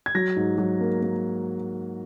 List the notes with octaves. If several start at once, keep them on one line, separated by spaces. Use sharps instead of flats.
G#6
F#3 A#6
G#2
F#3
A#3
A#3